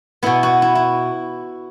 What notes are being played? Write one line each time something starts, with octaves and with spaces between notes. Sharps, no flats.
B2 B3 E4
F#4
E4
E4